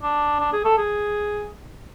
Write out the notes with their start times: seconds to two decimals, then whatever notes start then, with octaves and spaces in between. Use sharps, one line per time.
0.03 D4
0.40 D4
0.53 G#4
0.65 A4
0.78 G#4